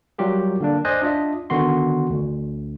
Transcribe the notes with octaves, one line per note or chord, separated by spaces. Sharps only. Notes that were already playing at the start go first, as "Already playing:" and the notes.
F#3 G3 F4 G4 A#4
D3 A#3 D4
C5 D5 D#5 G#5 F#6
D4 F4 D#5 E5
D3 D#3 B3 F#4 C6
D2